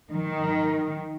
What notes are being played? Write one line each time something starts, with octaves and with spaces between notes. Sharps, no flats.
D#3